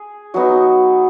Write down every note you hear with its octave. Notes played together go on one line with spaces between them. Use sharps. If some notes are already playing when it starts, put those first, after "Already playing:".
Already playing: G#4
F#3 B3 D#4 F#4